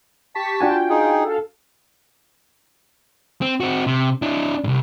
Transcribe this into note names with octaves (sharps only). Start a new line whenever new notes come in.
G4 A5 C#6 B6
D4 F4 F#4 G5 G#5
D#4 G#4
A4 F5
C4
C4 F#4
C3
D4 E4
C2 G#2